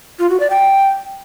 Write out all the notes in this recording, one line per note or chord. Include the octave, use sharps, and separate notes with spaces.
F4
F#4
D5
G5